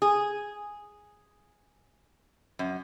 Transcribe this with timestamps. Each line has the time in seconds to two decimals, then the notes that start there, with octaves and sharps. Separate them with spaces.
0.02 G#4
2.59 F#2